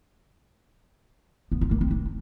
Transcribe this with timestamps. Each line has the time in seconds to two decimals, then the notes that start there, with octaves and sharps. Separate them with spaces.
1.52 B3
1.61 F4
1.71 A#3
1.81 C4
1.91 D4